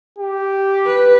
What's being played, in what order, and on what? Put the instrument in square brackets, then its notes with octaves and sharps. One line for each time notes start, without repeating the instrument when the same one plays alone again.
[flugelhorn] G4
[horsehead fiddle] B4